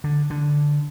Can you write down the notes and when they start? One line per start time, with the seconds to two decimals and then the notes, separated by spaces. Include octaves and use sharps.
0.04 D3
0.30 D3